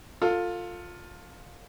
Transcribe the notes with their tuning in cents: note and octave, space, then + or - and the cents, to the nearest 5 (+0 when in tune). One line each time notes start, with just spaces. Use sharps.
F4 +15 A4 +25